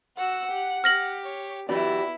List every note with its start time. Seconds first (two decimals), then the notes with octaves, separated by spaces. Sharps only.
0.17 F#4 F#5 E6
0.50 G4
0.84 G4 F6 A#6 F#7
1.23 C#5
1.69 B3 E4 F#4 G4 D5 B5